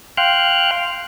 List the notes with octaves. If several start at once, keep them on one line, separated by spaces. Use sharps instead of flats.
F5 G5 C6 F6 F#6